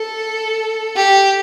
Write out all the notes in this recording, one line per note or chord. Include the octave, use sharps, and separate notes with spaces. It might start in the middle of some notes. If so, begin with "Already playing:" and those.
Already playing: A4
G4